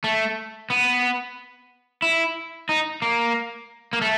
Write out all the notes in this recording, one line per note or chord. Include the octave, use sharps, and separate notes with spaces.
A3
B3
E4
D#4
A#3
A#3
A3